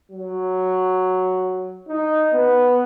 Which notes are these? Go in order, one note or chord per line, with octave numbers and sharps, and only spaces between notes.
F#3
D#4
B3